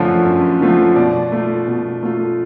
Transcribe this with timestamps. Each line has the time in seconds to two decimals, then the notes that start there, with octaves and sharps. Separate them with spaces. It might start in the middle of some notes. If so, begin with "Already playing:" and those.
Already playing: F#2 D3 F3 A3 F4 C#5
0.25 F#2
0.61 D3 F3 A3 F4
0.96 B2 D5
1.32 A3 F4
1.67 B2
2.03 A3 F4